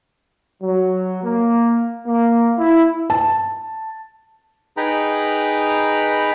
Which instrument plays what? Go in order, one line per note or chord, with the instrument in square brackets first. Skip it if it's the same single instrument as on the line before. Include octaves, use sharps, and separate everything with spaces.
[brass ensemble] F#3
A#3
A#3
E4
[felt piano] A5
[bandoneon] D#4 G#4 B4 G5 A#5 B5